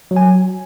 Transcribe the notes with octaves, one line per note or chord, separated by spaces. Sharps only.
F#3
G#5